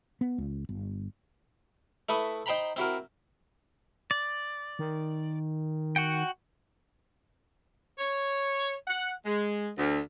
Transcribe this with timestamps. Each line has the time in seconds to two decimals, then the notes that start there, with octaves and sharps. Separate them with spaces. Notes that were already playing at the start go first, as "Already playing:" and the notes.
0.21 B3
0.38 C#2
0.69 G1
2.09 A3 E4 B4 C#6 D#6
2.46 D#4 C5 G5 A#5 B5
2.76 C4 E4 F#4 A#4
4.11 D5
4.79 D#3
5.96 F#4 F#5 G5
7.98 C#5
8.88 F#5
9.26 G#3
9.77 D2